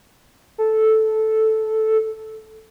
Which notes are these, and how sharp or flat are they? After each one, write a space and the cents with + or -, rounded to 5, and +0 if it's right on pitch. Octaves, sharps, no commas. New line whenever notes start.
A4 -5